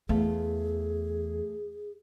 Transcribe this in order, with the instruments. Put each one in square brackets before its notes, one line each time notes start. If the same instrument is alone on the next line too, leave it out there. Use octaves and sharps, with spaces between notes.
[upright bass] E2 [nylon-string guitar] A3 B3 F5 [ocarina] G#4